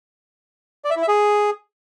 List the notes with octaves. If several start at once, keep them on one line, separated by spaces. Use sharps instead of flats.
D5
E5
E4
E5
G#4